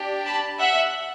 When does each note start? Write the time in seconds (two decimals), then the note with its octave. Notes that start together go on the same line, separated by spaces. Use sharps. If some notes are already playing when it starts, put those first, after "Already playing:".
Already playing: D4 G4
0.25 A5 B5
0.58 E5 F#5